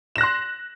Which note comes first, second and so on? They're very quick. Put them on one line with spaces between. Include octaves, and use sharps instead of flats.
E7 A#6 F#6 C6